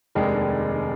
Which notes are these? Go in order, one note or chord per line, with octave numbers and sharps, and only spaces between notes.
F1 D#2 D#3 G#3 D4